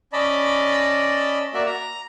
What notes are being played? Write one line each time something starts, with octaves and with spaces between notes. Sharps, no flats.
C#4 D5 D#5 A5 B5
A#3 F#4 D5 E5
A#5